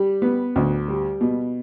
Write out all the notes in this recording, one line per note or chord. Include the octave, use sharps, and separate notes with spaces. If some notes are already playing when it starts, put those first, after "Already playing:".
Already playing: G3
B3
D2
G3
B2